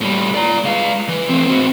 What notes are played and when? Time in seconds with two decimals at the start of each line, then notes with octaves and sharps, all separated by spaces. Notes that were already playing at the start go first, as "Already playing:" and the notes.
0.01 A2 G3
0.34 D5 A#5
0.64 G#3 F5
1.08 E3
1.29 A3 C4
1.47 C4 F#4